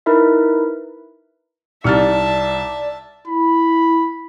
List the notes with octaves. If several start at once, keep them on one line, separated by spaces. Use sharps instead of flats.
D#4 E4 A#4 B4 E5
C2 D#4 G4 D5 E5 A5 F6 A6
E4 B5